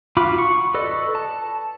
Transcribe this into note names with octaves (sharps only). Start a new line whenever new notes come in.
F4 F#4 B5 D6
C#6
A4 B4 D5 D#5
A5